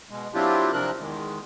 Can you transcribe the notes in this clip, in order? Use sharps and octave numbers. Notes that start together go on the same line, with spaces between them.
B2 G#3
F#3 C4 D4 E4 F4 G4
C3 F3 C4 D4 A#4 F#6
E2 D#3 G#3